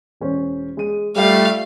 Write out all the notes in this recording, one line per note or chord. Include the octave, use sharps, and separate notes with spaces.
E1 C#4 C5
G#3 D#7
G3 A3 F4 A4 F5